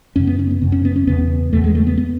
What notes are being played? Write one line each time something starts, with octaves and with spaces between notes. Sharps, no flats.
F#2 C#3 C#4
B3
C#4
B3
F#2 C#3
C#4
B3
C#4
E2 C#3 B3
E2 C#3 A3
G#3
A3
B3
B3